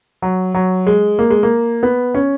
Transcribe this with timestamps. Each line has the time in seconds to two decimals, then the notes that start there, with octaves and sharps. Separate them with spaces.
0.22 F#3
0.54 F#3
0.87 G#3
1.19 A#3
1.30 G#3
1.43 A#3
1.83 B3
2.14 C#4